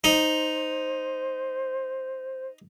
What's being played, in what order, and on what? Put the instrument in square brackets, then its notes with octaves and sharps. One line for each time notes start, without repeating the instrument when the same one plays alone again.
[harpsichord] D#4 [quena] C5